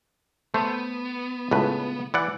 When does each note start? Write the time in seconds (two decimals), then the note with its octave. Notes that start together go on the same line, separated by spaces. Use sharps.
0.54 A3 B3 C5
1.51 C#2 A2 B4
2.14 E3 D5 F#5